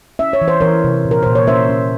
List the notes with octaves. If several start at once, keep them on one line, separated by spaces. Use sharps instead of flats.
C#4 E5
C#5
E3
C5
E3 A#4 C#5
C3
A#2
A#4
A#2 C5
C#5
C#4 C5 E5
C#4